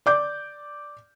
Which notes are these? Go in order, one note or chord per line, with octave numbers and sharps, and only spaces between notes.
D5 D6 G6